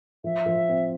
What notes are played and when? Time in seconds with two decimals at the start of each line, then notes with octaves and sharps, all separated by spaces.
0.24 F3 E5
0.46 F3
0.69 C4